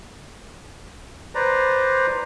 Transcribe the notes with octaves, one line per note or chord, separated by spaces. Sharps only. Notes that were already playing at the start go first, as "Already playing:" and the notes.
B4 C5 D5 A#5